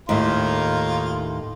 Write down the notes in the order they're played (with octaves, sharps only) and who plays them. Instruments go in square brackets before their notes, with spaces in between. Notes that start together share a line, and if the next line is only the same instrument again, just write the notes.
[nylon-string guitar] D#2 A2 [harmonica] D#3 A#3 F4